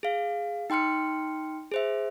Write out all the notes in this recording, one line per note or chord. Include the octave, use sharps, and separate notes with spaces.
G#4 F5
D#4 G5 C6 F6 C#7
G#4 C5 E5